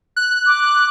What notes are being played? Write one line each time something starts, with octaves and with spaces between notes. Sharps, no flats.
F#6
D6